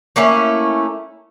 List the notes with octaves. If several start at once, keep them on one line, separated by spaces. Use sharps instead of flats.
A3 A#3 C#4 E4